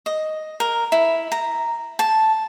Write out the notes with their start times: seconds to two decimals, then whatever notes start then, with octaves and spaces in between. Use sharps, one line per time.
0.06 D#5
0.60 A#4
0.92 E4
1.32 A#5
1.99 A5